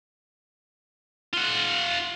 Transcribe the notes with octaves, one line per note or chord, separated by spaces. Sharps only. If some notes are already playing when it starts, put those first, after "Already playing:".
F4 F#5